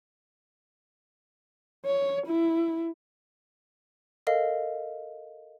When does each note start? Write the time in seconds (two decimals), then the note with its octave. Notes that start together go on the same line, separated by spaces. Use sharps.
1.86 C#5
2.27 E4
4.27 A4 A#4 D#5 F5